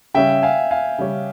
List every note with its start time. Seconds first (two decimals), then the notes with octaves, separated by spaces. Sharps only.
0.14 C#3 G3 C#4 E5 G5
0.42 F5 G#5
0.71 F5 G#5
0.99 C#3 G3 C#4